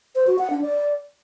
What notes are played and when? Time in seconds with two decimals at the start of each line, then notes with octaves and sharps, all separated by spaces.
0.15 C5
0.27 F#4
0.39 F#5
0.50 D4
0.62 D5